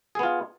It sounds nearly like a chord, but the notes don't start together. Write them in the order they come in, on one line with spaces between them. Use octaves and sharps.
G#4 B3 F4